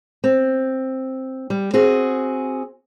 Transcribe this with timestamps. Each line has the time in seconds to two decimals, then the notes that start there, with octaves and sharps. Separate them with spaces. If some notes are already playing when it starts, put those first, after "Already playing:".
0.24 C4
1.50 G3
1.73 C4 F#4 G#4